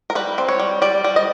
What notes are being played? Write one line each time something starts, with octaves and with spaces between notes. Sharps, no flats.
A#4
G3 B4
C4
C#5
G3
G3 D5
G3
D#5